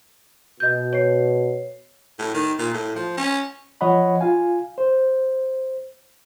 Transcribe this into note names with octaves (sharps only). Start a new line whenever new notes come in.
B2 D#5 G6
C#5 C7
A2
D#3
A#2
A2
F3
C#4
F3 C#5 D#5 F#5 B5
F4 F5 G#5
C5